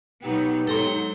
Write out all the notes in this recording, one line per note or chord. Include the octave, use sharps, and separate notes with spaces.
B2 F#3 B3 D#4 G4
G#2 F#3 A4 A#5 C6